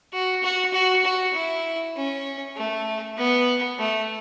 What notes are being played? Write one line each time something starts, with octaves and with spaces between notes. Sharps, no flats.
F#4
F#4
F#4
F#4
E4
C#4
A3
B3
A3